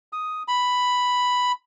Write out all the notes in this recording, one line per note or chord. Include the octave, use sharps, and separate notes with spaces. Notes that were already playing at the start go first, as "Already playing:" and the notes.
D#6
B5